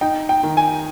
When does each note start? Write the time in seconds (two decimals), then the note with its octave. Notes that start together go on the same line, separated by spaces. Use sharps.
0.01 D#4 G5
0.29 G5
0.43 D#3
0.57 G#5